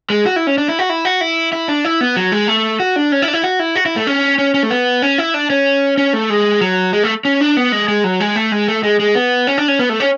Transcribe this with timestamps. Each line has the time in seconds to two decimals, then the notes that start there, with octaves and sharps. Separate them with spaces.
0.10 G#3
0.26 F#4
0.36 E4
0.47 C#4
0.58 D4
0.68 E4
0.79 F#4
0.90 E4
1.05 F#4
1.21 E4
1.53 E4
1.68 D4
1.84 E4
2.01 B3
2.17 F#3
2.32 G#3
2.48 A3
2.80 F#4
2.96 D4
3.12 C#4
3.22 E4
3.28 D4
3.33 E4
3.43 F#4
3.59 E4
3.76 F#4
3.86 E4
3.96 A3
4.07 C#4
4.39 C#4
4.54 C#4
4.63 A3
4.70 B3
5.02 C#4
5.18 E4
5.34 D4
5.50 C#4
5.98 C#4
6.13 A3
6.30 G#3
6.61 F#3
6.93 G#3
7.03 A3
7.25 C#4
7.41 D4
7.57 B3
7.72 G#3
7.88 G#3
8.04 F#3
8.20 G#3
8.36 A3
8.52 G#3
8.68 A3
8.83 G#3
9.00 G#3
9.15 B3
9.47 C#4
9.58 D4
9.68 C#4
9.79 B3
9.89 A3
10.00 C#4